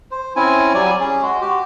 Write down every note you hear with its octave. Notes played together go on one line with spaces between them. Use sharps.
C5
C4 C#4 E4 G#5
F#3 G3 D5 G#5
C#4 G#4
G#3 F#4
F#4 G4